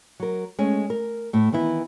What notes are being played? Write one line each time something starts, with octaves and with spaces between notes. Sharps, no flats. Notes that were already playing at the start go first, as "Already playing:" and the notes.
F#3 A#4
G#3 A3 C#4
A#4
A2 A3
D#3 E3 B3 E4